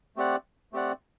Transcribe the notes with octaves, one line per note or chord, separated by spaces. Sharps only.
A3 C4 G4 D5 F#5
A3 C4 G4 D5 F#5